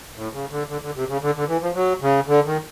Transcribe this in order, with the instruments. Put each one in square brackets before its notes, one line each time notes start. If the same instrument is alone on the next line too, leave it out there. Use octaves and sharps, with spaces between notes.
[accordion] A2
C#3
D3
D3
D3
C3
C#3
D3
D3
E3
F3
F#3
C#3
D3
D#3